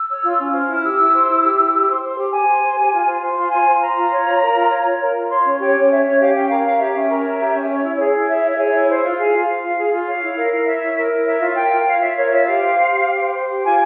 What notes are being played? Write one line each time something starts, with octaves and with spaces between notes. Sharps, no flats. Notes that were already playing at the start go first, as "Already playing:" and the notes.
Already playing: E6
C#5
F4
C#4
C5 F6
E4 F6
G4 E6
E4
C5
E4
G4
E4
G4
C5
C5
G4
G4 G#5
C5
C5
G4
F4
C5
C5
F4
F4 G#5
C5
C5 A#5
F4
C#5
F4
A#4
F4
C#5
F4
A#4
F4
C#5 C6
C#4
G4 C#5
C#4
C#5 E5
C#4 C#5
G4 F5
C#4 G5
A#4 F5
C#5 F5
G4 E5
C#4 E5
A#4
C#5
G4
C#4
C#5
E4
G#4
E4
C#5 E5
E4
E5
G#4 C#5
E4
C5
F4
G#4 F5
F4
C5 F5
F4
G#4
F4
C#5 F5
E4
A#4
E4
C#5 E5
E4
A#4
E4
C#5 E5
F4
A#4 G5
F4
C#5 F5
F4 E5
A#4 C#5
F4 E5
G4 F5
C5
C5
G4
G4
C5
C5
G4
F4 G#5